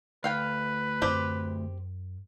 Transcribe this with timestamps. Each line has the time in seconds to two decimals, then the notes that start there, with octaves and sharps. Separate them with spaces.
0.24 D2 B4 F5 G5
1.02 F#2 C4 G4